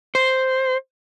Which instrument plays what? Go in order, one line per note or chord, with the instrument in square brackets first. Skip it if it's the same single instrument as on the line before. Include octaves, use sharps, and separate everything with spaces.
[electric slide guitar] C5